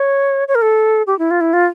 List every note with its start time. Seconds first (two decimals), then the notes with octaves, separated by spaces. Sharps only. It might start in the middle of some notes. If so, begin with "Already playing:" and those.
Already playing: C#5
0.48 C#5
0.55 A#4
0.62 A4
1.07 G4
1.19 E4
1.31 F4
1.41 E4
1.53 F4